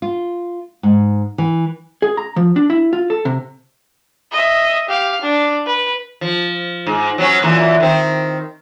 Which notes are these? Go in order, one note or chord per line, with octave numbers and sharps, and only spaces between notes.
F4
G#2
E3
G#4
A#5
F3
D4
E4
F4
A4
C3
D#5 E5
G4 F5
D4
B4
F3
G#2
F#3 B3 C#4
F#2 A#2 E3
D#3 C4